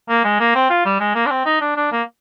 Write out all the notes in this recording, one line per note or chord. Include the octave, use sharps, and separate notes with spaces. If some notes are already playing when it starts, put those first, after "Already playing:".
A#3
G#3
A#3
C4
F4
G3
G#3
A#3
D4
C4
D#4
D4
D4
A#3